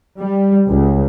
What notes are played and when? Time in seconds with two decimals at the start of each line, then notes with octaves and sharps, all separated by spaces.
0.19 G3
0.69 C#2